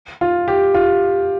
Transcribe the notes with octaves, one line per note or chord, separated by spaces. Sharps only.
F4
G4
F4